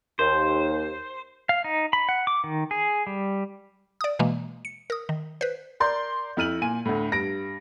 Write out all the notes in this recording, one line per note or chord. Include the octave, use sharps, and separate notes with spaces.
D#2 C5
F5
D#4
B5
F#5
D6
D#3
G#4
G3
D5 D#6
B2 E3 G#3 A#3
C#7
A#4 D#6
D#3
B4 C5
A#4 D5 C6 G6
F2 E4 F6 D#7 F#7
A#2 G#5 D#7
D2 A2
G2 A#6 D7